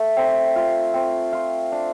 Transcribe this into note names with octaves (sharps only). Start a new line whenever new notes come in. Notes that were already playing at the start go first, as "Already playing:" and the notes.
Already playing: A3
C4
F4
C4
F4
D4